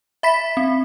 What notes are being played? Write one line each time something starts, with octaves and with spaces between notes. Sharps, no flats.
E5 B5 B6
C4